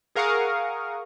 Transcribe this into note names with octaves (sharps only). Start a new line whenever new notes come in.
G#4 A#4 F5 F#5 C#6 D#6